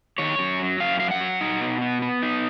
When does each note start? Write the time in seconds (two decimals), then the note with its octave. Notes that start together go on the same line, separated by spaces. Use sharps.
0.18 D#3 C#5
0.39 F#2
0.60 F#3
0.80 F#2 F5
1.00 F#3 F5
1.11 F#5
1.21 F#3
1.41 D#4
1.61 B2
1.82 B3
2.02 B3
2.22 D#4